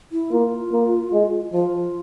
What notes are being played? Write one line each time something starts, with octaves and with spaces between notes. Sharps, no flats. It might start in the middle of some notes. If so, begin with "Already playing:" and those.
E4
A#3 F4
A#3
G#3
F3 F4